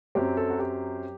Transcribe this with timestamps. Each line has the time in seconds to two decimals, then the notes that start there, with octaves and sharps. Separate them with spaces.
0.15 F#2 F#3 C4 G4
0.37 A4
0.50 F#4
0.59 G4